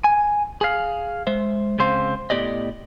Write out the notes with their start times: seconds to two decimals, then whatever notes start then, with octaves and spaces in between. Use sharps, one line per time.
0.04 G#5
0.61 G#4 F5
1.27 G#3 C5 E5
1.79 C#2 C#3 C4 C5 F5
2.30 A2 B3 G4 D5 D#5